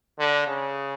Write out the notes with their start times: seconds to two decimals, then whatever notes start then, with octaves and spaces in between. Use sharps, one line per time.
0.19 D3
0.48 C#3